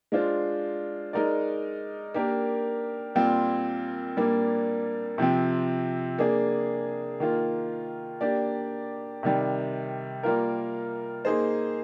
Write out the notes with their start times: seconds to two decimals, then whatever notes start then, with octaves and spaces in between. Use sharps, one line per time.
0.12 G#3 D4 F4 C5
1.13 G#3 D#4 A#4 D5
2.14 A#3 D4 G4 A#4
3.15 A#2 G3 C4 F4
4.17 A#2 G3 A#3 D4
5.18 C3 F3 C4
6.18 A#3 D4 G#4
7.20 D#3 A#3 F4
8.21 A#3 D4 G4 D5
9.23 C3 D#3 G3
10.23 G3 A#3 F4 A#4
11.25 A#3 D#4 G#4 C5